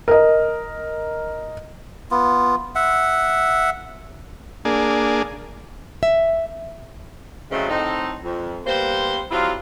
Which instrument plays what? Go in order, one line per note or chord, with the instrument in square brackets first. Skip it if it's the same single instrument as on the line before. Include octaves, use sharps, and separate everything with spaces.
[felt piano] A#4 D#5
[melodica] B3 F4
E5 F#5
[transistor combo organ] A#3 D4 G#4
[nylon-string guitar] E5
[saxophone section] C#3 E3 F#3 G#3 A3 C4
A2 C4 D#4
F2
G3 A#3 B3 C5
F#3 G3 C4 E4 F4